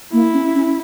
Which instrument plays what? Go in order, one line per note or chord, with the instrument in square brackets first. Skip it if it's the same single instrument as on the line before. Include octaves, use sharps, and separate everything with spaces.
[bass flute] A#3 [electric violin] E4
[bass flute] C#4
C#4